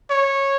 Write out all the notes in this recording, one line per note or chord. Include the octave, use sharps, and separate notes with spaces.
C#5